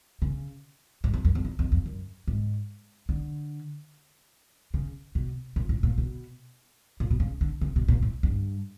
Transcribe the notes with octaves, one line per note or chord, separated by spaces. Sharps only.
C#3
G#2
F2
F#2
F2
E2
F2
F2
F#2
G#2
D3
C#3
B2
A#2
A2
A#2
B2
A#2
B2
C#3
D3
C#3
B2
A#2
A2
G2